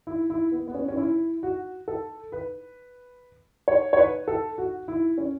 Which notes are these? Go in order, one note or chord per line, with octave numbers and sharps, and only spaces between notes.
E4
E4
B3
B3
C#4
C#4
E4
F#4
A4
B4
C#5
C#5
B4
A4
F#4
E4
C#4